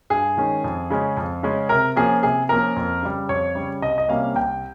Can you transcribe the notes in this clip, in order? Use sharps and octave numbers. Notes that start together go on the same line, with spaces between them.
G2 G#4
D#3 G#3 C#4
F2
C#3 G#3 C#4
F2
C#3 G#3 C#4
C3 A#4
F3 A#3 C#4 G#4
C3 G#4
F3 A#3 C#4 A#4
F2
C#3 G3
F2 C#5
C#3 G3
C2 D#5
D#5
C3 G3 A#3 C#4 F5
C2 G5